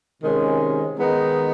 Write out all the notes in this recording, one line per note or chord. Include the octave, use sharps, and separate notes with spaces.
C3 D#3 G#3 C#4
D#3 G#3 B3 D#4